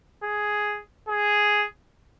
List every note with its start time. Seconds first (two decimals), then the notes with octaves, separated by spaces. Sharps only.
0.24 G#4
1.09 G#4